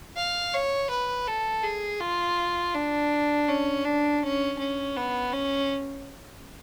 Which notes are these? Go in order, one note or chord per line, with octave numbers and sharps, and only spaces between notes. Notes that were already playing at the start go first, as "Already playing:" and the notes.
F5
C#5
B4
A4
G#4
F4
D4
C#4
D4
C#4
C#4
B3
C#4